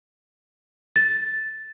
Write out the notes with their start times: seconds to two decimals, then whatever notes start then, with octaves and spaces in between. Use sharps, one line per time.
0.96 A6